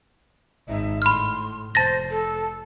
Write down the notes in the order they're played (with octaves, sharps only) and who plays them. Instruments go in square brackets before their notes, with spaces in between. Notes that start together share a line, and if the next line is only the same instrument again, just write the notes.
[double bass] G#1 D#4 [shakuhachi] E5
[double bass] A2 [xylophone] B5 F6 [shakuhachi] C6
[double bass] F1 [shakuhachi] C5 [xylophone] A5 A6 A#6
[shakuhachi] A4